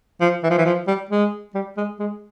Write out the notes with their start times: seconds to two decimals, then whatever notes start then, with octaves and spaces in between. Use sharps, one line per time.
0.21 F3
0.43 E3
0.50 F3
0.58 E3
0.66 F3
0.87 G3
1.11 G#3
1.55 G3
1.77 G#3
1.99 G#3